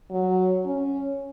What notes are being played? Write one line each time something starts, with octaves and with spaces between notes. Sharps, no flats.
F#3
C#4